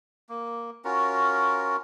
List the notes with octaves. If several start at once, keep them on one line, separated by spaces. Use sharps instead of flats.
A#3
C#4 F4 F#4 A#4